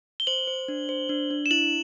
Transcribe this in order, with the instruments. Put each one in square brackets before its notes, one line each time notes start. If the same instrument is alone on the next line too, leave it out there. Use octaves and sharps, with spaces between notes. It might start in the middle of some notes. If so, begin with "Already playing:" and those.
[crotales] G7
[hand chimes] C5 [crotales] F#7
[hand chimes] C5
D4
C5
D4
D4
[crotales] E7
[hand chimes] E4 [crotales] F#7